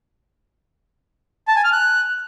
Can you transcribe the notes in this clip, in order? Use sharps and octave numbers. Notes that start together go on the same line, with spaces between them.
A5
G#5
F6
F#6